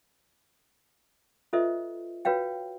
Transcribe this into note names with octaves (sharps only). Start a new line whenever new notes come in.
F4 A4 B4 C5 D#5 E5
F#4 B4 C#5 F5 G5